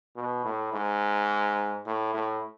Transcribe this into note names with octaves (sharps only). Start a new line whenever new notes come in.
B2
A2
G#2
A2
A2